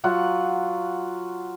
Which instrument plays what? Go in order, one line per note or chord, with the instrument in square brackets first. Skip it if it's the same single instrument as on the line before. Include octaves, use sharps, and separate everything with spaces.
[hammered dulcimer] F#3 F4 F#5